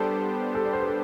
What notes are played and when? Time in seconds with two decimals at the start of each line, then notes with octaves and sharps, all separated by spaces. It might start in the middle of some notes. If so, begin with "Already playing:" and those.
Already playing: G3 B3 D4 G4 A4 C5
0.55 A4
0.65 D5
0.73 C5
0.80 B4
0.87 A4